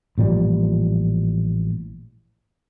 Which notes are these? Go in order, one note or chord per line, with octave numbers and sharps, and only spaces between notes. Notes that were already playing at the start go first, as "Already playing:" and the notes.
A1 A#2 F3 G3